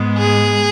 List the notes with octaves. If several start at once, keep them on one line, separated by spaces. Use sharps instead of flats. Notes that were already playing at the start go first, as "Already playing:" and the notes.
Already playing: G#2 G#3 B3
G#4